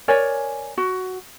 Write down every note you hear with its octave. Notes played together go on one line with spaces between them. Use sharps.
A#4 C#5 D5 G#5
F#4